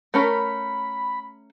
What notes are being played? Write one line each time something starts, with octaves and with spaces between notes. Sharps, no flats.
A3 C#4 A#4 B5